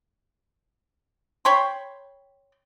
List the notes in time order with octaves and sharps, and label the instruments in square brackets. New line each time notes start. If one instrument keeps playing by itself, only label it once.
[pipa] C#5 G5 B5 C6